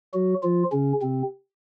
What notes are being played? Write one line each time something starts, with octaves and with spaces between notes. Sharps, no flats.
F#3 F#4
F3 F4
C#3 C#4
C3 C4